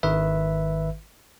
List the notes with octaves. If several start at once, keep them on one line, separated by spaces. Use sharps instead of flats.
G#1 D#3 B4 E5